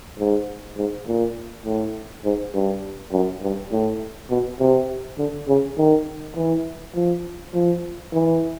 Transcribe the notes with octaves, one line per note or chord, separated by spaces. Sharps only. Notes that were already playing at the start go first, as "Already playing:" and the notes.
G#2
G#2
A#2
A2
G#2
G2
F#2
G2
A2
B2
C3
D3
C#3
D#3
E3
F3
F3
E3